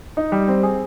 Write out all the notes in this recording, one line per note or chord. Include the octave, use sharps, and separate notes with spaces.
D#4
G3
C4
G#4